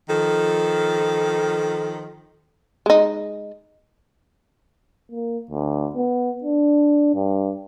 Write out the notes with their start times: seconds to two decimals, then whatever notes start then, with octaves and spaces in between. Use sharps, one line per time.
0.09 D#3 F3 A4
2.86 G#3 D#4
5.11 A#3
5.51 D2
5.95 B3
6.44 D4
7.15 G2